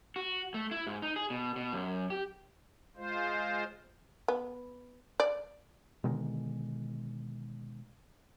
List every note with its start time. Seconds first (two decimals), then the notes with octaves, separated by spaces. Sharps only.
0.16 F#4
0.54 A3
0.71 E4
0.87 G#2
1.02 D#4
1.16 G#4
1.30 B2
1.56 B2
1.72 F#2
2.10 G4
2.97 G#3 F4 C5
4.28 B3
5.20 D5
6.04 B2 D3 D#3 G#3